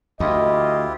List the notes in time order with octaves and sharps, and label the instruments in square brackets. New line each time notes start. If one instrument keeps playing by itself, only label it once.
[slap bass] D2 [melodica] E4 F4 G4 [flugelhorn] D#5